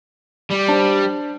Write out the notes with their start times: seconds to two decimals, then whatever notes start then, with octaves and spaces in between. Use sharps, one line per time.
0.51 G3
0.68 D4 C5 A5